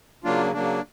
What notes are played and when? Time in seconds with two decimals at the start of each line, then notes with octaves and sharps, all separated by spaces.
0.24 C#3 F#3 A#3 D4 F4
0.53 C#3 F#3 A#3 D4